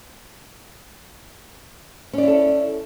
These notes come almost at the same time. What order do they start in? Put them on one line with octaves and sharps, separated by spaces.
C#4 D5 E4 A4